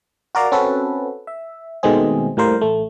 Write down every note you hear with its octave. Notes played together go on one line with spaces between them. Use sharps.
F#4 A#4 D5 F5 A#5
C4 C#4 F#4 A4 B4
E5
B2 D#3 G#3 A3 C4 G#4
A2 G3 A#3 A#4 C5
A1 A3